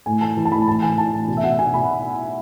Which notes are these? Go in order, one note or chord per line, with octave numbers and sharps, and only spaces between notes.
A2 G#5
E3 A5
E3
A5
A2 B5
A2 A5
E3 G#5
E3 A5
A2
B2
E5
B2 F#5
B2 G#5
B2 B5